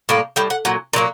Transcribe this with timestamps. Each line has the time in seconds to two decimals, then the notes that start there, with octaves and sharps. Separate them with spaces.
0.09 A2 G3 A#3
0.36 A2 G3 G5
0.50 F#5
0.65 A#2 F#3 F#5
0.93 A#2 F#3 A#3 D5